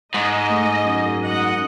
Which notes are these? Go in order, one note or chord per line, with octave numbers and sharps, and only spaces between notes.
G#2 D#5
A3
F#2
D#5 F#5